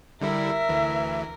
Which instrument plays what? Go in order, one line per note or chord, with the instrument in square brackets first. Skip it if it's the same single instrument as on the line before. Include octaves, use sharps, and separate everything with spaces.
[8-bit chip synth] D3 G3 E4 [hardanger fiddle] A#4 [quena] E5
[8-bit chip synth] D2 E3